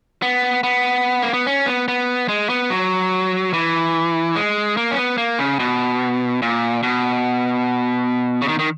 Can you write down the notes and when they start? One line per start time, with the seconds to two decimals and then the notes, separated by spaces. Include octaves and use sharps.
0.22 B3
0.63 B3
1.22 A#3
1.34 B3
1.47 C#4
1.66 B3
1.88 B3
2.29 G#3
2.50 B3
2.70 F#3
3.53 E3
4.36 G#3
4.77 A#3
4.91 C#4
4.97 B3
5.18 A#3
5.39 C#3
5.59 B2
6.42 A#2
6.83 B2
8.42 C#3
8.48 D#3
8.59 D#3